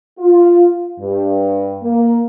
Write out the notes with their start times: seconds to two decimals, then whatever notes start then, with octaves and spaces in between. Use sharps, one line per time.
0.19 F4
1.00 G2
1.82 A#3